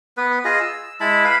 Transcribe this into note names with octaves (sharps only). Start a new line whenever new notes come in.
B3 B4
F4 G#4 D#5
E6
G#3 E4 A5 B5
B4 F5 B5